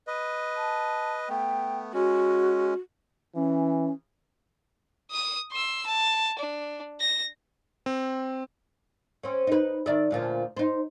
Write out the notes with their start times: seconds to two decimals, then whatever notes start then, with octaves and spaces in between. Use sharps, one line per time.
0.07 B4 D#5
0.57 A5
1.29 A3 B3 G5
1.94 G#3 C#4 F#4
3.36 E3 C#4
5.11 D#6 D#7
5.52 C6 E6
5.86 A5
6.39 D4
7.00 A#6
7.86 C4
9.23 C4 C#4
9.47 D#4 B4
9.86 D#3 D5 E5
10.11 D2 A#2 F3
10.57 D#4 C5